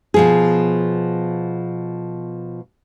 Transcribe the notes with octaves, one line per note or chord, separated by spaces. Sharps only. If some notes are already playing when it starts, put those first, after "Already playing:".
B2 F3 G#4